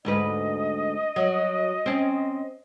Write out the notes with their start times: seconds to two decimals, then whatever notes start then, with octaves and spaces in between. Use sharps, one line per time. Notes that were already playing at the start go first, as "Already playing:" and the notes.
0.05 D2 G#2 B4 D#5
1.16 F#3
1.86 C4 C#4